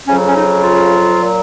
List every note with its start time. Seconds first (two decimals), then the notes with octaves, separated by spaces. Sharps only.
0.06 F2 C#3 F#3 C#4
0.27 C#4
0.35 D#4
0.63 F4
1.20 A#2 F#3